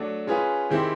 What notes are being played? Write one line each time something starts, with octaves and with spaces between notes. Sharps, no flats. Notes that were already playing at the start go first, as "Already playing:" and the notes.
Already playing: F#3 A3 D4
G#3 C#4 F4 G#4 B4
D#3 G#3 C4 E4 G4